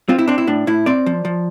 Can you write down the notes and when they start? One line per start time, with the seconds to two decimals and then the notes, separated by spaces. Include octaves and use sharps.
0.09 C4 F4
0.19 E4
0.28 C4 D4
0.38 E4
0.47 A2 D4
0.67 A2 E4
0.86 C4 D5
1.06 F3
1.25 F3